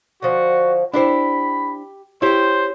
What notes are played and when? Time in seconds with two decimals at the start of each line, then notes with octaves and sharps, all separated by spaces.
0.22 D3 F3 F#4
0.94 D4 E4 G4 C5 B5
2.22 C#4 E4 G4 C5 G5